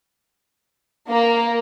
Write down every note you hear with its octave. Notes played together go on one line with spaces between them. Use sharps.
A#3